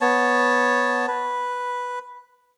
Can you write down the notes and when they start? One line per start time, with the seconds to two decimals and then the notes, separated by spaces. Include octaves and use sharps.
0.01 B3 C#5 A5
1.08 B4